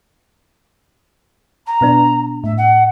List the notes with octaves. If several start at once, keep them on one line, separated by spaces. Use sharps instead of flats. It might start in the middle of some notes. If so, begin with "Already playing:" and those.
A#5
B2 B3 D4
A2 E5
F#5